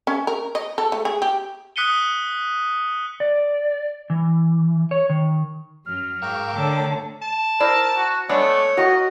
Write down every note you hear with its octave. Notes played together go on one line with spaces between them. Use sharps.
C#4
A#4
D#5
A4
A3
G#4
G4
D#6 F#6 B6 C#7 D#7 G7
D5
E3
C#5
D#3
F#2 F#3 F6
G#2 A#4 F5 G5 C#6 D6 E6
D3 A3 C#5 A5 E6
A5
E4 A#4 C5 D5
F#4
G#3 A3 B3 D4 C#5
F#4 A#4 D#5